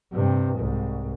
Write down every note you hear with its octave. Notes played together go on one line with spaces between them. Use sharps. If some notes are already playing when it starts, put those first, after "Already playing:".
G2 C3
C2 G#2